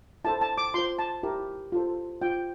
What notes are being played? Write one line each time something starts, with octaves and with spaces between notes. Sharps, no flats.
E4 A4 C5 A5
A5
D6
F4 C5 C6
A5
E4 G4 A#4
F4 A4 C5
F4 C5 G5